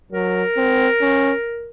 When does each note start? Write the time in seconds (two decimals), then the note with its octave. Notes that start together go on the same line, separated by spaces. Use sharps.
0.12 F#3 A#4
0.57 C4
1.01 C#4